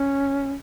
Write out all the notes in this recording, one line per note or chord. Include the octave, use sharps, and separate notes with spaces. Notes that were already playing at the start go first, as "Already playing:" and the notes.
Already playing: C#4